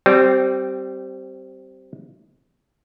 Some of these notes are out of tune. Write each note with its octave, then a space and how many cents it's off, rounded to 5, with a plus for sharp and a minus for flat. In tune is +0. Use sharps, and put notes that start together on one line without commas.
G3 -20 C4 +0